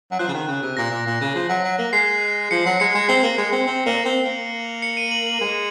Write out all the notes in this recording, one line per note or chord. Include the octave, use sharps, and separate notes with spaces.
F#3
F3 F#6
C#3
D#3
C#3
C3
A#2 A#6
A#2
A#2
C#3
F3
F#3
F#3
A#3
G#3 C7
F3 C#7
F#3
G#3 C#7
G#3
C4 C7
A#3
G#3
C4
C4
A#3
C4
A#3
C#7
D#7
F#7
F#7
G#3